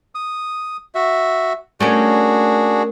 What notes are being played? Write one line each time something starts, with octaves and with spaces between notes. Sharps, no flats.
D#6
F#4 E5
A3 A#3 C#4 D4 F#4 G#4